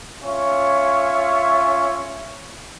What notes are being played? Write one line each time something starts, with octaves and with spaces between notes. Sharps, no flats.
C#4 F4 C#5 E5